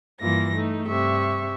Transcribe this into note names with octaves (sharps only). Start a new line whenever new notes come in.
G2 E3 A#3 F4 A#6
A3 D#4
G2 C3 E5 C#6